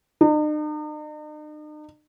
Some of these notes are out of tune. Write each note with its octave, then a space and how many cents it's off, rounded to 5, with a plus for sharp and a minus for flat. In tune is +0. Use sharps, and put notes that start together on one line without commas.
D#4 -45